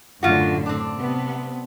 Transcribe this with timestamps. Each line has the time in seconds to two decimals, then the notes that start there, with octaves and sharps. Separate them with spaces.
0.23 F#2 A2 D3 F4 F#4
0.66 C4 D4
0.99 C3 B3